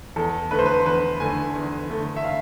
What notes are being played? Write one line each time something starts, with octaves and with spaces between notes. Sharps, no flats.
E2 A4
D3 A3 B4
C5
B4
E2 B4
D3 A3 G#5
E2
D3 A3
E5
F5